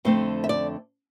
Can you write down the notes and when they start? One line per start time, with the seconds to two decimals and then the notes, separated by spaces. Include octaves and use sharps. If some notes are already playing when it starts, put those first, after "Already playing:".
0.05 F2 D3 A3 C4 C5
0.44 E5
0.49 D5